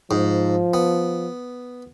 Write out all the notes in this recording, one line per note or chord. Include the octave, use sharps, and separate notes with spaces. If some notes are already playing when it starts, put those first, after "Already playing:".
G#2 F3
B3